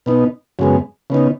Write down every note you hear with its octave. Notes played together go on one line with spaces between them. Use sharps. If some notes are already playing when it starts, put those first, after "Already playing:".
B2 B3 D#4
F#2 C#3 G#3 B3
C#3 B3 D#4